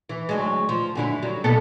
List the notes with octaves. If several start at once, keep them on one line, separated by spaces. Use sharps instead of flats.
E3
D2 F#3 G#3
F3
F#2 D3 E4
F#3 G3
B2 B3 A4